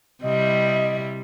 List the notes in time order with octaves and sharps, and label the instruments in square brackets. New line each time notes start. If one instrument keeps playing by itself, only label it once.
[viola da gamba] C3 G3 E4 [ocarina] D#5